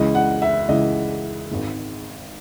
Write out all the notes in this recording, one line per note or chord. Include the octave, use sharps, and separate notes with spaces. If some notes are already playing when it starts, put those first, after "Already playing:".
Already playing: C#2 C#3 E3 D#5
F#5
E5
C#2 C#3 E3 D#5
G#1 G#2 D#3